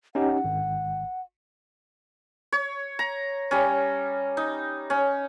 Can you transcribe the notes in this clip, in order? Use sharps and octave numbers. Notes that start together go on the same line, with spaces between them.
C#4 D#4 G4 F#5
G#1
C#5
A#5
G3 C#4
D#4
C#4